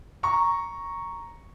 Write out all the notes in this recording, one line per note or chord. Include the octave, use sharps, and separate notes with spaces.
A#5 C#6